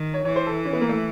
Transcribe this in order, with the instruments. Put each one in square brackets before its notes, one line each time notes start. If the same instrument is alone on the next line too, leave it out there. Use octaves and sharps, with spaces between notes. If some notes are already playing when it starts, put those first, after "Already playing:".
Already playing: [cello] D#3
[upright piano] C#5
[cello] E3 [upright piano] C#5
[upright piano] C5
A4
C#4
B3
A#3
A3